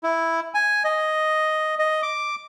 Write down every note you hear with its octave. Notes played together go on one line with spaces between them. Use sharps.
E4
G#5
D#5
D#5
D6